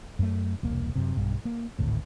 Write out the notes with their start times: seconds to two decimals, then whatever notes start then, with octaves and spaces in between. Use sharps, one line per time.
0.19 F#2 A3
0.63 E1 C2 A#3
0.95 F#2 C3
1.17 B1 G2
1.45 A#3
1.79 G#1 D2 A2